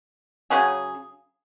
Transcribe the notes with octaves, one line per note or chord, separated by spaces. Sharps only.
C#3 F#3 C#4 G#4